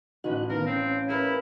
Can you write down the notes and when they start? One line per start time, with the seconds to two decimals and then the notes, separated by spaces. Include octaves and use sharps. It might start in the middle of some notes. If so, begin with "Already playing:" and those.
0.24 A1 C#4 D#4 F#4 F#6
0.50 D#3 B3 A#4 F5
0.66 C4 C#4
1.08 E4 G#4 A#4 B4